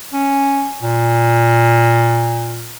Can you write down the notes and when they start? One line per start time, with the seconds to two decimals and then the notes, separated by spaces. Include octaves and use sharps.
0.13 C#4
0.82 A#2